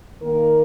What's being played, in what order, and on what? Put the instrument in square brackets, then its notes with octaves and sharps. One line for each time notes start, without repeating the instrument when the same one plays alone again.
[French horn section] D#3 A#3 A#4